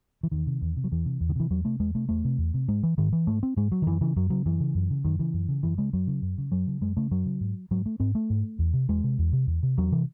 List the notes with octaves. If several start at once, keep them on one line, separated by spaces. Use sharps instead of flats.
E3
E2 D#3
C3
E2
C3
F#3
E2 E3
C3
E2
D#3
C3 E3
E2 F#3
C3 A3
E2 G#3
C3 A3
E2 A3
C3
E2
C3
G#2 G#3
E3
G#2 D#3
E3
G#2 A3
C4
G#2 G#3
F#3
D#3
F#2 E3
C#3 E3
F#2 F#3
C#3 F#3
F#2 E3
C#3
F#2
C#3
F#2 D#3
C#3 E3
F#2
C#3
F#2 E3
C#3 G#3
F#2 F#3
C#3
F#2
C#3
F#2 F#3
C#3
F#2 G#3
C#3 A3
F#2 F#3
C#3
G#2
G#2 F#3
A3
G#2 C4
A3
G#2
E2
C3
E2 G#3
C3
E2
C3
E2
C3
E2 F#3
C3 E3